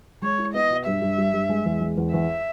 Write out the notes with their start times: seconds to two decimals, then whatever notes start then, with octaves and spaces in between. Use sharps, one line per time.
0.22 G#3 C#5
0.38 E4
0.54 B3 D#5
0.70 B2
0.86 G2 E5
1.02 G2
1.18 G3
1.34 G2
1.49 G#3
1.66 E2
1.81 G#3
1.97 E2
2.13 E2 E5